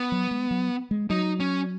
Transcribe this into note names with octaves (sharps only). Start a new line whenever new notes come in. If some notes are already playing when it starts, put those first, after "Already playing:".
Already playing: B3
F#3
G#3
F#3
G#3
F#3 D#4
C#4